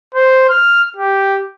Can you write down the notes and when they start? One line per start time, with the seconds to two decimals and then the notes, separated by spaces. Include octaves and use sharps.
0.15 C5
0.50 F6
0.97 G4